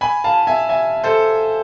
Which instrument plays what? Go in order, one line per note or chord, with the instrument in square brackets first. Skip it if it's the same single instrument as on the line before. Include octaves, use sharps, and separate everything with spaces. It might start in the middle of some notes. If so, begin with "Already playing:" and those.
[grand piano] G#5 B5
F5 A5
E5 G#5
E5 G#5
A4 C5